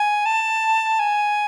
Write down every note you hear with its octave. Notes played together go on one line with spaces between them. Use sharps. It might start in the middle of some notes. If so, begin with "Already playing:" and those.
Already playing: G#5
A5
G#5